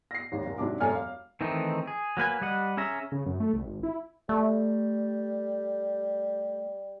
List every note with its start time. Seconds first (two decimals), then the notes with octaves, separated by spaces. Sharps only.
0.11 A#6 C7
0.32 G#1 D#2
0.46 F#1
0.58 G#2 C3 F#3 D4 D6
0.80 E1 F#2 A4 G#5 F6
0.95 F5
1.41 D#3 E3 A3 C4 D#4
1.87 G#4
2.17 F#3 A#3 B4 G#5
2.41 G3 D#5 F#5
2.77 C#4 G#4 E5 A#5
3.12 C#3
3.26 F#2
3.40 A3
3.54 C2
3.66 G#1
3.83 E4
4.29 G3 A3